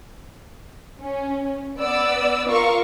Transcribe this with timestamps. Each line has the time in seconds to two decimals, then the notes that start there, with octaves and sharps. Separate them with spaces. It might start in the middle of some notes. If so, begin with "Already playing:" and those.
1.00 C#4
1.77 B3 D5 E6
2.49 F4 A#4 F5 C#6